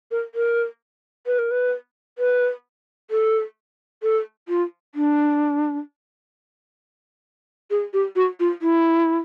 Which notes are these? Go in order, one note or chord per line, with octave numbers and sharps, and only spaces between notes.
A#4
A#4
B4
A#4
B4
B4
A4
A4
F4
D4
G#4
G4
F#4
F4
E4